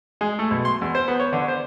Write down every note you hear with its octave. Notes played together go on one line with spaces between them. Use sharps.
G#3
A3
B1
C6
E2
C5
B3
C#5
D3
C5